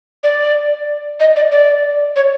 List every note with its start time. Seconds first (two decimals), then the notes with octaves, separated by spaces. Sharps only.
0.24 D5
1.20 D#5
1.36 D5
1.52 D5
2.16 C#5